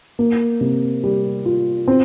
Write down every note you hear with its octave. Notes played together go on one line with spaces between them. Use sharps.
A#3
C3
G3
F4
C4